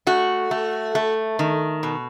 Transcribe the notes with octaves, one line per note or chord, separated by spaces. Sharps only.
A3 F#4
A3
A3
D#3
B2